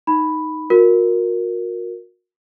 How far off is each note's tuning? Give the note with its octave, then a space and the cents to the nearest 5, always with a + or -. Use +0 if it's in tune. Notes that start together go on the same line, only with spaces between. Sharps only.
D#4 +0 B5 +0
F#4 -40 A#4 +0